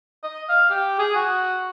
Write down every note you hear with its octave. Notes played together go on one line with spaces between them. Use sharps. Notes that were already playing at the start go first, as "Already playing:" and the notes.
D#5
F5
G4
G#4
F#4